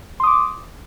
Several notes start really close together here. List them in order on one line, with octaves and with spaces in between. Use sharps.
C6 D#6 D6